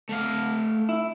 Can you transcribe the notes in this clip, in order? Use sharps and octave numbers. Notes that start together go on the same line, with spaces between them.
A3 F5
E4